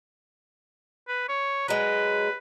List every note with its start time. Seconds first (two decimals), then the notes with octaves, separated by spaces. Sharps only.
1.08 B4
1.29 C#5
1.68 F#3 G#3 B4